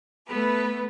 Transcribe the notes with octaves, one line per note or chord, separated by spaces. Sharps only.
A3 B3 A4 B4